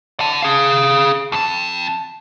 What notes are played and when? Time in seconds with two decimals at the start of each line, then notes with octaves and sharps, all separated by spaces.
0.20 F#5 A5
0.42 G#4 F5
1.32 F2 A5